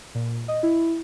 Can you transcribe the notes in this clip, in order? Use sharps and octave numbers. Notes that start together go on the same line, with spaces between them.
A#2
D#5
E4